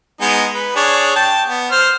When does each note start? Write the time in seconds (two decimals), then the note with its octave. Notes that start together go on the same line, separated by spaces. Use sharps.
0.21 G#3 B3 D#4
0.55 B4
0.76 D4 G#4 C#5
1.16 G5 A5
1.48 B3
1.71 C5 F6